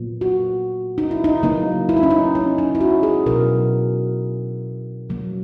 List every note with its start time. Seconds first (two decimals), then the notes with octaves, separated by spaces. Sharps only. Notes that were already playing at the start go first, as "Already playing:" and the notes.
Already playing: A#2 F#3 B3
0.21 F#4
0.98 D#4
1.11 E4
1.24 D#4
1.43 C#3 F#3 A#3 D#4
1.89 E4
1.97 D#4
2.03 C#4
2.11 D#4
2.35 C#4
2.58 D#4
2.75 E4
2.81 F#4
3.03 G#4
3.26 B2 F#3 B3 A#4
5.09 C#3 F#3 A#3